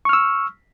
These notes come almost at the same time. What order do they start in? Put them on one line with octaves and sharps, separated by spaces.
C#6 F6 E6